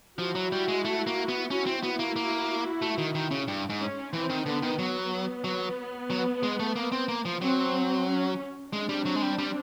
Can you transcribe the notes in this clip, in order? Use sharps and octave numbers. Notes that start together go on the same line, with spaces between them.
F3 E4 F#4
F#3
G3
G#3
A3
A#3
B3
C#4 E4 F#4
C4
B3 E4 F#4
A#3
A#3
A3
D#3
D#3
C#3
G2
G#2
C#4
E3 C4
D#3
D3 B3
D#3
F#3 B3
F#3
F#3
G#3
A3
A#3
C4
A#3
F3
F#3 C4
C#4
G#3 C4 D4
G3
F#3
G#3
G3
G3